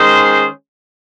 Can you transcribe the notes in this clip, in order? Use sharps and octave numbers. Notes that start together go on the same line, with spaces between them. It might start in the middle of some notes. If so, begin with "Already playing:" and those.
Already playing: D#3 G#3 C#4 G#4 C5